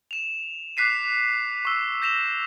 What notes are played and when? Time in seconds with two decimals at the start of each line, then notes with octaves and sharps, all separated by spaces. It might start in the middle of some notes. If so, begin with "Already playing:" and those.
0.11 E7 F7
0.77 D6 F#6 B6 C7 D#7
1.65 C#6 E6
2.02 G6 A#6 E7 F7